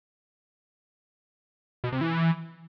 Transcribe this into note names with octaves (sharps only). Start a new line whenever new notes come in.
B2
C3
E3